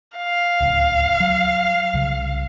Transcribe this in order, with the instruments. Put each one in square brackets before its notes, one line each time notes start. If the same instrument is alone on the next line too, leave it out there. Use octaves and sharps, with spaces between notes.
[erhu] F5
[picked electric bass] D1 C#2
F#3
C2 C#3